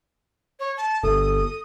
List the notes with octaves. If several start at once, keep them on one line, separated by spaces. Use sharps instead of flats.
C#5
A5
G1 A4 D#6